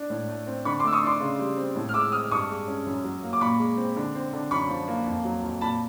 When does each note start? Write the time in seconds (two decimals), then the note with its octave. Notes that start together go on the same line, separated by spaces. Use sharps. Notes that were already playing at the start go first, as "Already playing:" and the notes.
Already playing: D4
0.10 A2
0.29 A3
0.47 C4
0.65 D3 B5 C#6
0.80 C6 D6
0.84 A3 E6
0.93 C#6 D#6
1.03 D4 C6 D6
1.20 C#3
1.39 G3
1.57 C4
1.75 A2
1.89 F6
1.94 G#3 D6 E6
2.12 C4 D#6 F6
2.31 G2 C#6 D#6
2.50 G#3
2.67 C#4
2.86 F#2
3.04 F#3
3.23 A#3
3.33 D6
3.41 A#2 B5 C#6
3.59 G#3
3.77 C4
3.97 D3
4.15 C4
4.33 D3
4.51 F#2 B5 C#6
4.69 F3
4.87 A#3
5.06 F2
5.25 F#3
5.43 F2
5.61 A#2 A5 B5